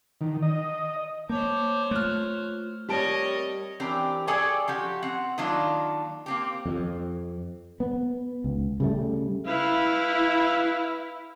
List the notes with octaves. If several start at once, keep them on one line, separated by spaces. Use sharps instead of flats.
D#3
D#5
A#3 C5 C#5 A5 D6 G6
A3 F4 F6 F#6
G3 C4 G4 A#4 C#5 D#5 A5 D7
E3 C4 D4 G4 A#4
G#4 A4 C#5 D5 G5 G#5
F3 F#4 G4
C4 F#5
D#3 F#3 A#3 D4 F4
A#3 C4 G4
F2
B3
C#2
C#3 G3 A3
E4 B4 F5